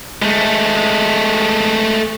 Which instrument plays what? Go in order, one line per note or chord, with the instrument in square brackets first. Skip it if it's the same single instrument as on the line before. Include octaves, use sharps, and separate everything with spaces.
[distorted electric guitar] G#3 A3